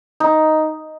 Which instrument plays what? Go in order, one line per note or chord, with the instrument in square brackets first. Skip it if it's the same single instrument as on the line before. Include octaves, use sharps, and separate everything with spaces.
[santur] D#4